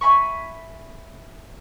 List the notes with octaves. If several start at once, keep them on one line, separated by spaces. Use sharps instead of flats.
E5 G#5 B5 C#6